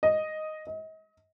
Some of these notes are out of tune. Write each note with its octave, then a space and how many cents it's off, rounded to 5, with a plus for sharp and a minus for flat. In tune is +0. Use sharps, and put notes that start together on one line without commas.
D#5 +0
D#5 +35